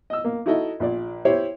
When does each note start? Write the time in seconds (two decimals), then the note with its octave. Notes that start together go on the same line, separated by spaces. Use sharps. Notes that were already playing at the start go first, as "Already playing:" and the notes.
0.10 D#5 E6
0.25 A#3
0.46 D#4 E4 F#4 A4 D#5 E5
0.80 A#1 A#2 D5
1.25 E4 G4 C5 C#5 E5